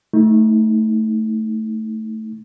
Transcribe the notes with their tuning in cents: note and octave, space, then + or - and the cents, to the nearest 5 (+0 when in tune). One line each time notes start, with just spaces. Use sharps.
A3 +0 D#4 +30